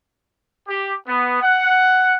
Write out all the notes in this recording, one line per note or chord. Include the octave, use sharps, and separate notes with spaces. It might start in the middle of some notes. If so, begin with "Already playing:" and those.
G4
B3
F#5